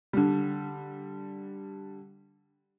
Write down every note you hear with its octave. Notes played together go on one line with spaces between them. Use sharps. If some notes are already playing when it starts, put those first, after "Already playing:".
D3 G3